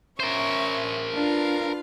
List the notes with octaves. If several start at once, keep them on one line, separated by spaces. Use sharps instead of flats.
C#4 A#4 C5 E5 C#6
D4 F4 B4 F5